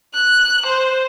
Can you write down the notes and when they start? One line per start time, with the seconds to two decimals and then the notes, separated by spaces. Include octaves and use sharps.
0.14 F#6
0.66 C5